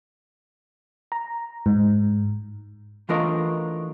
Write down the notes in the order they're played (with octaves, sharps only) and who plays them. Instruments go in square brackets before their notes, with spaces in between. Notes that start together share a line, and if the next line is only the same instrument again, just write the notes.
[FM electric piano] A#5
G#2
[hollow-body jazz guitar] E3 A3 D4 F4 A#4 D#5